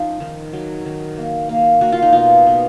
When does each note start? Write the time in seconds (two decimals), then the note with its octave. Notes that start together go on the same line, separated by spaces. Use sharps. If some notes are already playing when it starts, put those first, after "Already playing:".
Already playing: F3 C#4 D#4 F4
0.20 D#3
0.53 F#3
0.85 D#3
1.17 A#3
1.49 A#3
1.81 A#3 F#4
1.92 F4
2.02 D#4
2.12 B2 F4
2.46 B2